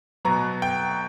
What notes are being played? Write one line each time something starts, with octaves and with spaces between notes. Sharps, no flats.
B2 F#3 B3 A#5
G5